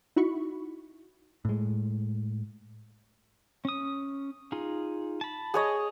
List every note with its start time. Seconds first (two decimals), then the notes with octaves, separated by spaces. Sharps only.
0.16 D#4 E4 F#4 B5 C#6
1.45 A2 G#3
3.65 C#4 D#6
4.52 D#4 F4 G#4
5.21 A5 B5
5.54 G#4 C#5 D#5